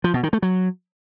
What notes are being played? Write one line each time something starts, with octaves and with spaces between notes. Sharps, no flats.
F3
B2
D#3
A3
F#3